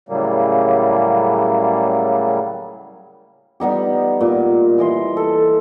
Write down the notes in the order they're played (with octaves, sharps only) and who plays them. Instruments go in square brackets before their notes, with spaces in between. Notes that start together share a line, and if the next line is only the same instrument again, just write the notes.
[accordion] A2 C#3 F#3 G3 A#3
[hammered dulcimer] G3 B3 D#4 G4
A#2
E3 D#5 C6
A4